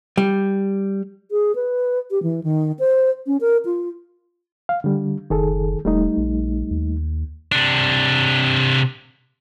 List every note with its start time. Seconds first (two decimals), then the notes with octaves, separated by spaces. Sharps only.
0.18 G3
1.31 G#4
1.55 B4
2.11 G4
2.23 E3
2.44 D#3
2.79 C5
3.27 C#4
3.41 A#4
3.65 F4
4.69 F5
4.84 D3 G3
5.30 F#1 D#3 G#4 A4
5.85 D#1 G3 A3 D#4
6.17 A#1
6.71 D#2
7.52 C3 D4